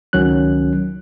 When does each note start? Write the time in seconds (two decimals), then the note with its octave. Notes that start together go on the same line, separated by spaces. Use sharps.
0.13 C#2 D#3 F#3 C#4 F#6